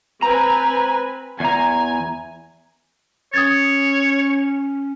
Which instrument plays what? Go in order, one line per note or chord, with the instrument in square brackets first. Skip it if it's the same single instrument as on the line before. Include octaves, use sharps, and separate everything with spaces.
[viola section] C4 B4 G#5 [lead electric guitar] A#5
[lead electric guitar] E2 A#5 [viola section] G#5
[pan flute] C#4 [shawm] C#5 [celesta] D#6 G#6 A6